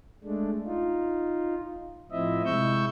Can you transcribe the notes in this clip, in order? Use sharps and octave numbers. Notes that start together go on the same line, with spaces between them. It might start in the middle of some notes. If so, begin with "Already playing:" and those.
G#3 A3 D4
D#4 F4
A2 F3 C4 E4 D#5 E5
C3 G#3 E4 C#6 E6 G6